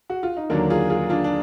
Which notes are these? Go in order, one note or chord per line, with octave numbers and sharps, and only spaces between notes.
F#4
F4
D#4
D#2 D3 F#3 A#3 D4
F4 G#4
F4 G#4
D4 F4
D4